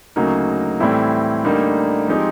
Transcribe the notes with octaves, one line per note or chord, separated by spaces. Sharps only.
D2 C#3 F#3 A#3 D#4
A2 E3 G3 C4 E4
D2 D3 G3 A#3 D#4
F3 G#3 C4 D#4 G4